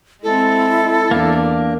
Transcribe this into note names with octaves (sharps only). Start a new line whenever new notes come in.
G#3 C4 E4 A4
E2 A#3 D4